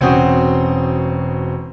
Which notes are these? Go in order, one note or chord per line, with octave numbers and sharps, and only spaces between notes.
E1 C4 C#4 F#4 C5 D#6